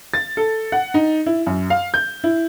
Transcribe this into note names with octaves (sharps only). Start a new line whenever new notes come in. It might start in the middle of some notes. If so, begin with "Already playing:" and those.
A6
A4
F#5
D#4
E4
F#2
F5
G6
E4